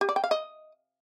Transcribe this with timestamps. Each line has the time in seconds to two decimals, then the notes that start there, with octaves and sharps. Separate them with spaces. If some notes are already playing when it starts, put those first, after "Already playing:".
0.01 G4
0.09 D5
0.16 G5
0.24 F5
0.31 D#5